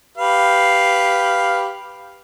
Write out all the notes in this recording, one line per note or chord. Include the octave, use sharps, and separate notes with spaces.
G4 B4 F5